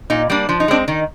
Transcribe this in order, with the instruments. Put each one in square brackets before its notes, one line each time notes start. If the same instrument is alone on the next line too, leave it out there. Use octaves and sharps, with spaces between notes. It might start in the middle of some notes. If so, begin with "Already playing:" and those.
[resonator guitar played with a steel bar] A#2 D#4
G3 A#3 D4
F3 D4
D#4
G#3 C4 D4
D#3 D#4